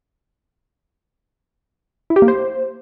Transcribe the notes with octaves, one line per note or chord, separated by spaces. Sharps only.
E4
G4
A#3
C5